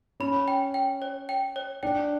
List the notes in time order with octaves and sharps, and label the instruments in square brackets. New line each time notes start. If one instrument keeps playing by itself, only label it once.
[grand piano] C#4 [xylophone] B5
[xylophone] G5
G5
C#5
G5
C#5
[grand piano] D4 [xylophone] G5